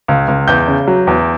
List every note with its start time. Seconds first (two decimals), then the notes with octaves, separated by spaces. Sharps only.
0.08 C#2
0.28 C#2
0.48 E2 G6
0.68 C#3
0.87 F#3
1.07 E2